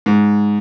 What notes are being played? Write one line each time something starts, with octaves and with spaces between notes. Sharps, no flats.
G#2